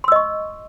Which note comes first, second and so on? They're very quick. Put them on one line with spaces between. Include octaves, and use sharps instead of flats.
C6 E6 D#5 C#6